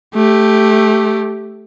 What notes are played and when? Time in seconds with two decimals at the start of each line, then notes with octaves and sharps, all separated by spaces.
0.15 A3 G4